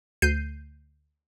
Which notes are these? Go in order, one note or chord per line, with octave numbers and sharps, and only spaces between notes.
D2 G6 C7 D#7